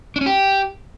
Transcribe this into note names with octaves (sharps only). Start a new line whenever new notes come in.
D4
C#4
G4